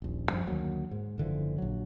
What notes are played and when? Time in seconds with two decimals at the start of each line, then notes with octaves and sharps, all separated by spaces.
0.02 D#1 A#1
0.28 F#2 F3 G3
0.47 D2 D#3 F#3 A#3
0.91 G#2
1.18 F#1 D3 E3 F3
1.58 A#1 F#3